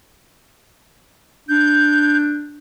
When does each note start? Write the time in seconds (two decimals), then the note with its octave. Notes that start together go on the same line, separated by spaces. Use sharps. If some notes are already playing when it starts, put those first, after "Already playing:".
1.49 D4 G6